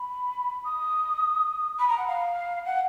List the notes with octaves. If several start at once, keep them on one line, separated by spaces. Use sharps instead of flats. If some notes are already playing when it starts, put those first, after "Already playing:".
Already playing: B5
D#6
B5
A#5
F#5
F5
F#5